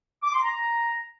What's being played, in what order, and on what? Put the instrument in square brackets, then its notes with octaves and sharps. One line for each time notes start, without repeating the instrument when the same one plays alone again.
[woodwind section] D6
C6
A#5